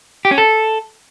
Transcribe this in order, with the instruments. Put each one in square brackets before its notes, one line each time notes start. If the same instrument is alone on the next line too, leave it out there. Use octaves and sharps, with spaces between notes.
[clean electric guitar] G4
C#4
A4